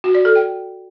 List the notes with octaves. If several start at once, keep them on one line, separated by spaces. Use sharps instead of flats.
F#4
D5
A4
G5